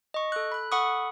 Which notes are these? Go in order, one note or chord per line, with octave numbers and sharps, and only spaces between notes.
D#5 C#6
A4 F#6
B5 F#6
A4 F#5 B5 C#6 D#6